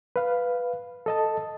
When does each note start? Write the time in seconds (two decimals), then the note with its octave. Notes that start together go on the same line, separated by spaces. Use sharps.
0.16 B4 F5
1.06 A4 D#5 A5